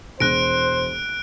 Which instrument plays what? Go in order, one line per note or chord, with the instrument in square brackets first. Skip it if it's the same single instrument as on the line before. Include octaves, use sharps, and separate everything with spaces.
[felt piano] E1 A#6 [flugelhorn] C5 [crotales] F#6 D7